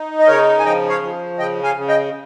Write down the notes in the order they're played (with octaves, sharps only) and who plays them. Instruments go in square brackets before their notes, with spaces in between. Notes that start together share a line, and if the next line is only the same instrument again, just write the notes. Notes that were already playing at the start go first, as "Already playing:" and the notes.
Already playing: [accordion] D#4
D#5
C#3 A#4 C#5
G#5
F3 D#5 G5
C#5 F5
F3
C#3 D#5 G5
F5 G#5
C#3
D#5 G5